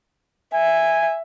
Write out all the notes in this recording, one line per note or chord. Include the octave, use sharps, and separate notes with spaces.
E5 G#5